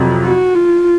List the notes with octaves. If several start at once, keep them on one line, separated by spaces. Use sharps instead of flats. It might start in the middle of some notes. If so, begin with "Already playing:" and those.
Already playing: F2 C3 F#3
F#4
F4